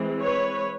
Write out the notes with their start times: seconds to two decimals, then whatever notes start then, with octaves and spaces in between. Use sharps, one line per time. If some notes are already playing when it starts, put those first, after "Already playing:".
Already playing: E3 G#3 C4
0.21 B4 C#5